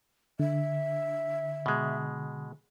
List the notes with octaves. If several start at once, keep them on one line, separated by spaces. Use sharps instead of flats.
D3 E5
B2 G#3